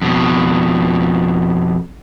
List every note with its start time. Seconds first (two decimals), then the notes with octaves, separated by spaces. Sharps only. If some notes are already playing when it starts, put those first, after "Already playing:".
0.02 F2 B2